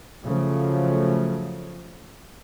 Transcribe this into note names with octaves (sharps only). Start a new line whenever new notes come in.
C#3 F3 F#3 A3